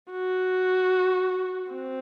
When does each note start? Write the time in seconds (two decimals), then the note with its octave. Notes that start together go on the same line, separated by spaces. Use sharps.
0.11 F#4
1.71 C4